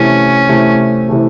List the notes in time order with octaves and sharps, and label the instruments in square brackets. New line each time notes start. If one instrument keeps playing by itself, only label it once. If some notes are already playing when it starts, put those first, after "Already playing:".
Already playing: [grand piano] C3 E3 A3 [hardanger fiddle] C#4
[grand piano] C3 E3 A3
C3 E3 A3